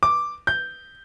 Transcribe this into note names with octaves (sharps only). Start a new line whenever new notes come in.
D6
G6